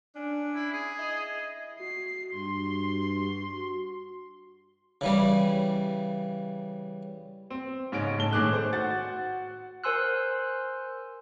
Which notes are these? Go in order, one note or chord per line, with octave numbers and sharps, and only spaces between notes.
C#4 D4
E4
G#4
E4 D#5
F#4 C7
G2 C6
C#3 E3 G3
C4
G#2 C#3 C#4 D#4 D7
A2 A5 G7
A2 D#3 G#4 D6 F#6
C5
F#4 F#5 A6
A#4 C5 G#5 C6 E6 F#6